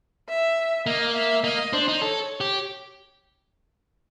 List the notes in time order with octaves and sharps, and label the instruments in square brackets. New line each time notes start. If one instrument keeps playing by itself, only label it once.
[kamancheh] E5
[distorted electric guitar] A#3 [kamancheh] D#5
[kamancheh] E5
[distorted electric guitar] A#3 [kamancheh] D#5
[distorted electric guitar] D4 [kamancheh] C5
[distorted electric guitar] D#4
[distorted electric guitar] A4 [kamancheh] C#5
[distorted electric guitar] G4